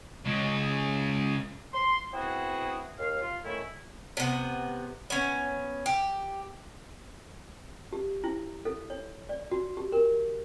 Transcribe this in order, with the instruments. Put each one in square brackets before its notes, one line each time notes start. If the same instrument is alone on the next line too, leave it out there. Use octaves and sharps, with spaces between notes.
[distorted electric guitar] C#3 G#3
[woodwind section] C6
B3 C4 E4 F#4 G#4
D#2 F5
F4
D#3 A3 C#4 E4
[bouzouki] C3 B3
B3 C#4
G4
[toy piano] G4
E4
A4
C#5
D5
F#4
G4
A#4